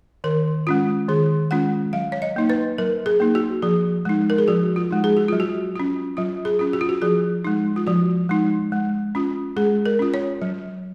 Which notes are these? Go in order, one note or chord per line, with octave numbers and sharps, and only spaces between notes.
D#3 A#4
G#3 C#4 F4
D#3 G#4
G#3 C#4 F4 F#5
F#3 F5
C#5
D#5
A#3 D#4
B4
F#3 A#4
G#4
A#3 D#4
F#4
F3 G#4
G#3 D#4
A#4
G#4
F3 F#4
F4
G#3 D#4
G#4
F#4
F#3 F4
F#4
C#4 F4
F#3 F4
G#4
C#4 F4
F#4
F4
F#4
F3 G#4
G#3 D#4
F4
F3 F#4
G#3 D#4
G#3
C#4 F4
G#3 G#4
A#4
C#4 F4
C#5
F#3